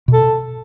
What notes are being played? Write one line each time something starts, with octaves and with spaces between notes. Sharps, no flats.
B2 A4